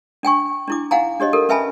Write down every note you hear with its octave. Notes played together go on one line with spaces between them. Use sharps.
D4 G5 G#5 C#6
D4 E4 D6
D#4 F5 F#5 G#5 A#5
D4 G4 C#5 D#5
G4 A4 A#4
C#4 B4 E5 G#5 A5 B5